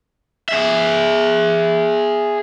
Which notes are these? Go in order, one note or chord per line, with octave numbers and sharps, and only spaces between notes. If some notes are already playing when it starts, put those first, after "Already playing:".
G#4 E5